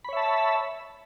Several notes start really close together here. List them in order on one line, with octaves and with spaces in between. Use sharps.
B5 C#5 E5 A5